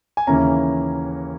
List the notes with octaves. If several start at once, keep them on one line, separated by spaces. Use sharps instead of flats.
G#5
D#2 C#3 E3 A#3 C#4 A#5